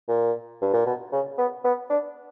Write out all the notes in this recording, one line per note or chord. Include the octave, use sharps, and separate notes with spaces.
A#2
G2
A#2
B2
C#3
B3
B3
D4